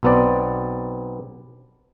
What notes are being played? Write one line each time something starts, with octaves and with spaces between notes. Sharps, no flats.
B1 B2 B3 C4 D5